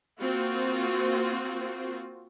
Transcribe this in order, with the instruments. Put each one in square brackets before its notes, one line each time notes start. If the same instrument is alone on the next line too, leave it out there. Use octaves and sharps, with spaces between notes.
[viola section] A#3 C4 F4 F#4